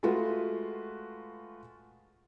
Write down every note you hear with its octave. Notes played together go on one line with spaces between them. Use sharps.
G#3 A3 F4 F#4 B4